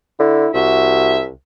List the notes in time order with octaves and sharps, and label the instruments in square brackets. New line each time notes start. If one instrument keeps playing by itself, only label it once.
[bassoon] D3 [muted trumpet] E4
[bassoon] C2 [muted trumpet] F#4 [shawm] E5